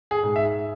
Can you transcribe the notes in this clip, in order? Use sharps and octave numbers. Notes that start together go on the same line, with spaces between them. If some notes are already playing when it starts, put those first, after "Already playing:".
G#4
G#2
E5